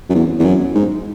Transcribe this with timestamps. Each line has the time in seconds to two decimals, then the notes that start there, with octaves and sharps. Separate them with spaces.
0.10 F#2
0.15 E2
0.39 E2
0.45 F#2
0.75 G#2